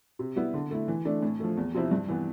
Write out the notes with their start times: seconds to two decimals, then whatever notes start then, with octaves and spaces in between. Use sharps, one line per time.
0.19 C3
0.36 G3 B3 E4
0.54 D3
0.71 A3 E4
0.88 E3
1.05 A3 D4
1.23 A2
1.40 F3 A3
1.57 E2
1.74 C3 F3 C4 E4
1.91 G2
2.08 E3 B3